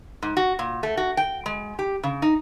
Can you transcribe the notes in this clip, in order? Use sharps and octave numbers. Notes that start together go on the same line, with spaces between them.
G#2
F#4
A#2
A3
F#4
G5
G#3
G4
C#3
D#4